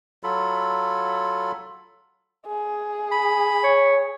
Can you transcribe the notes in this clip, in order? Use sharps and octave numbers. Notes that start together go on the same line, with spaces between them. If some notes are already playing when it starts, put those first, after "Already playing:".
F#3 F4 A4 B5
G#4
B5
C#5